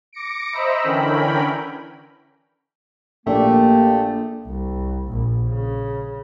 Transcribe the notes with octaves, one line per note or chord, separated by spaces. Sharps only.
D6 A#6 C#7 D7
C5 D#5 E5 A#5 B5 E6
D3 E3 C#4 A#4 G5 B5
A#1 A3 A#3 G4 D5
C2
A#1
C#3